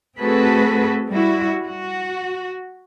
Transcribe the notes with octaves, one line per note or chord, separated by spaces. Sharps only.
A3 C4 F#4 G#4 A4 B4
G3 E4 F#4
F#4